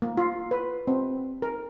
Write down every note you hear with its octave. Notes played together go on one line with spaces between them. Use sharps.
A#3
F4
B4
C4
A#4